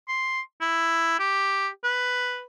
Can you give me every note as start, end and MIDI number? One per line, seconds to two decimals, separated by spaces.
0.08 0.41 84
0.61 1.16 64
1.19 1.68 67
1.84 2.43 71